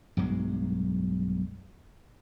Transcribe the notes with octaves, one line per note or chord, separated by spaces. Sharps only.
B1 G2 F#3 G#3